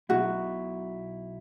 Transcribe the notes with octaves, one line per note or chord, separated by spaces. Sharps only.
B1 B2 F#3 E4 F#4